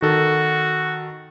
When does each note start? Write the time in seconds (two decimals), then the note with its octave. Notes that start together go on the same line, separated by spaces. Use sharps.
0.02 D#3 F#4 A4